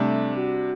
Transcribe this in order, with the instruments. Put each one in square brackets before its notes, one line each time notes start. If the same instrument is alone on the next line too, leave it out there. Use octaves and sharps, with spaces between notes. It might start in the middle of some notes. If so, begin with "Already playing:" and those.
Already playing: [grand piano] C3 G3 D4 [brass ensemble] A3
[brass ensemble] F#4